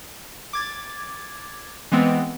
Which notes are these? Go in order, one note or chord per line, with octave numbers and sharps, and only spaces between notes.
D6 G#6 A6
E3 G#3 B3 C4